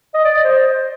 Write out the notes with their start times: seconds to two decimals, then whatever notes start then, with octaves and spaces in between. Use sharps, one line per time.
0.14 D#5
0.24 D5
0.34 D#5
0.44 C5